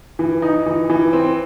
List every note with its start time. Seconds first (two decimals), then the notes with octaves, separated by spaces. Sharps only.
0.19 E3
0.42 D#4
0.66 E3
0.90 E3
1.13 C4